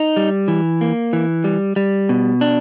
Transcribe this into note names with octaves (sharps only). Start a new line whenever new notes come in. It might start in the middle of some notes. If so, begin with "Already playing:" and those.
Already playing: D#4
G3
E3
A#3
E3
G3
G3
B2
D4